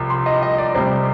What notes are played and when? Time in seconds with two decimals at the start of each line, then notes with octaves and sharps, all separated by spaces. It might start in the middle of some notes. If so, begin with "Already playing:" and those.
Already playing: C2 C3 F3
0.10 C6
0.26 D#5
0.42 D#5
0.58 D5
0.75 C2 C3 G3 C5